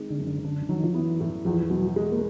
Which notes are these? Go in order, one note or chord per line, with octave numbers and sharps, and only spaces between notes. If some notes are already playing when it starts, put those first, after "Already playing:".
Already playing: D#3 G#3 C4
D3
F#2
D3
D3 D4
D#3 F#3
F3
E3 B3
A2
E2 F3
B2 F#3
G#3
A#3